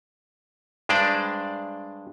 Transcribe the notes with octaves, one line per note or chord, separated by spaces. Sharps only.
G2 G#3 D4 C5 D5